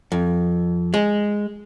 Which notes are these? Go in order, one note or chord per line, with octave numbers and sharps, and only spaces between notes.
F2
G#3